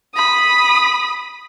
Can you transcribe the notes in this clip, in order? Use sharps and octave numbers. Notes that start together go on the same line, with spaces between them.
B5 D#6